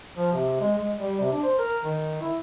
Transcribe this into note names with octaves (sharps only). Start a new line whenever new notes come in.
F3
C3
G#3
G#3
G3
C3
D4
C5
A#4
D#3
E4